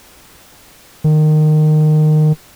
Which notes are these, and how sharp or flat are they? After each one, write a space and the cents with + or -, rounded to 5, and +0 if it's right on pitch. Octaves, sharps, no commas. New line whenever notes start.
D#3 -20